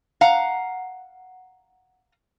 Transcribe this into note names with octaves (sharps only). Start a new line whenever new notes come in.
F5 F#5 A#5